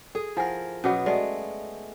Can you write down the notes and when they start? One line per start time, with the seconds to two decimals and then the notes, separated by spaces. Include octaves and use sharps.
0.15 G#4 A4
0.37 F3 E4 A#4 F#5 G#5
0.84 B2 F#3 B3 C#4 G#4
1.06 G#3 A3 D5 D#5